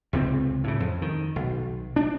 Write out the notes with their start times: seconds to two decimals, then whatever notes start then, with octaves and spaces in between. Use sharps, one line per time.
0.13 C#2 C3 A3 C4
0.64 A2 C#3
0.80 F2
1.02 D#3
1.36 B1
1.96 D4